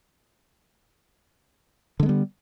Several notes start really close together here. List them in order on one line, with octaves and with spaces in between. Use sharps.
D3 G#3 B3 G3